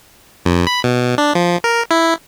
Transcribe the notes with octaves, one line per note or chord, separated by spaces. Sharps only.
F2
B5
B2
D4
F3
A#4
E4